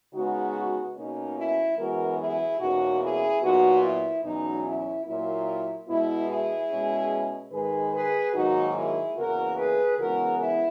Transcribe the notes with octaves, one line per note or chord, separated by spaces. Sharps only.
C#3 G#3 B3 D#4 F#4
B2 A#3 C#4 D#4
E4
F#2 E3 G#3 B3 F#4 A#4
E4 G#4
E2 B2 A#3 C#4 D#4 F#4
E4 G#4
A#2 F#3 B3 D#4 F#4
E4
E2 B2 F#3 C#4 D#4
E4
A#2 F#3 A#3 E4
B2 G#3 B3 E4
E4 G#4
B2 G#3 C#4
G#2 D#3 G#3 G#4 B4
G#4 B4
G#2 D#3 F#3 A#3 D#4 F#4
E4 G#4
E2 C#3 E3 A#3 F#4 A#4
G#4 B4
C#3 E3 G#3 B3 F#4 A#4
E4